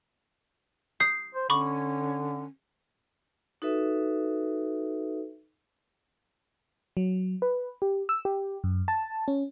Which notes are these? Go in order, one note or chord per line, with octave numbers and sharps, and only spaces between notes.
D#6 G6 C7
C5
D3 C#4 B5 C#6 D6
D#4 F#4 A4 B4 E5
F#3
B4
G4
E6
G4
F#2
A5
C#4